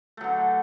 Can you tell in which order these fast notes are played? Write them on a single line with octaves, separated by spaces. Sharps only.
A3 F#3 D3